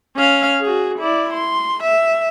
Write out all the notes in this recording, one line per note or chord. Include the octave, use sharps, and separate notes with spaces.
C#4 F5
F#4 G#4
E4 D5
C6
E5